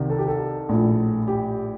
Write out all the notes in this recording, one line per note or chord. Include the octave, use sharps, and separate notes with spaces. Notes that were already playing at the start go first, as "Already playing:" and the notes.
Already playing: C2 C3 D#3
A4
G4
A4
A#1 A2
G4